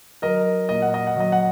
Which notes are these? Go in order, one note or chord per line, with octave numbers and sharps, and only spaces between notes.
F#3 A#4 D#5
A#2 D#5
F#5
D#5
F#5
F#3 D#5
F#5